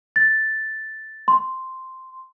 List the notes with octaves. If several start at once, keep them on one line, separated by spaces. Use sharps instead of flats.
A6
C6